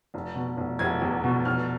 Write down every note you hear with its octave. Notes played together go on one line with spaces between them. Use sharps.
F1
B2
F1
F1 G#6
E2
B2
F1 F6